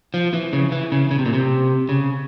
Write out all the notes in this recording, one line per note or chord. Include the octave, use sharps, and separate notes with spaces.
F3
E3
C#3
E3
C#3
C#3
C3
A#2
C3
C#3